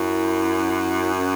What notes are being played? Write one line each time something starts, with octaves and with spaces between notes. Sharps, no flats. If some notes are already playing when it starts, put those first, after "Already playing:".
Already playing: F#2 E4
C#4